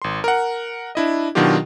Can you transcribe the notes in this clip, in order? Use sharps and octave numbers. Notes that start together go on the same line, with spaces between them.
G#1 C6
A#4 F#5
D4 E4 D#5
B2 D#3 F#3 D4 F4 G4